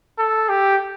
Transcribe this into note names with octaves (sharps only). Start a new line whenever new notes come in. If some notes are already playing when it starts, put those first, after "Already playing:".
A4
G4